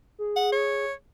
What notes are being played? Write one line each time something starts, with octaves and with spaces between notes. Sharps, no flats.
G#4
F#5
C#5